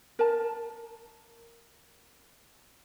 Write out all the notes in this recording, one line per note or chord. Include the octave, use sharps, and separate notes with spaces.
A#4 A5